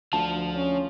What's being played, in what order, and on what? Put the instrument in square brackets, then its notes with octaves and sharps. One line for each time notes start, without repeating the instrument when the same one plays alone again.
[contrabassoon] D2 [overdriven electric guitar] F3 [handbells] A5
[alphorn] C#4